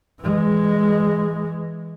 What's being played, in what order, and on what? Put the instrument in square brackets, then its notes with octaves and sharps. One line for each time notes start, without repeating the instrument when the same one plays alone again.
[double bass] E3 G#3